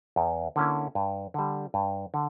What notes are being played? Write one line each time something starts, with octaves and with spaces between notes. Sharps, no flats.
E2
D3 A#3 C#4 E4
G2
D3 G3
G2
D3